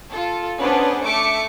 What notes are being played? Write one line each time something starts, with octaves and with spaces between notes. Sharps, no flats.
F4 A4
B3 C#4 D4 G#4 B4 C5
A3 E5 D6 C#7